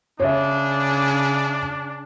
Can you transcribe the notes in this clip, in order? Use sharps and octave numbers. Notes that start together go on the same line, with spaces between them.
C#3 D4 C#5 E5